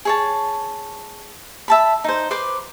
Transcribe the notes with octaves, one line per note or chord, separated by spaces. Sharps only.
G#4 C#5 A5
E5 A5 B5
D#4 C5
B4 C5 C6 D6